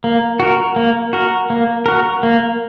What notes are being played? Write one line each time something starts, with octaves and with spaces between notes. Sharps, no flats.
A#3
F#4 A#4
A#3
F#4 A#4
A#3
F#4 A#4
A#3